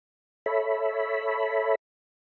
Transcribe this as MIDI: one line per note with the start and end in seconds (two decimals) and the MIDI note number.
0.46 1.75 69
0.46 1.75 73
0.46 1.75 76
0.46 1.75 83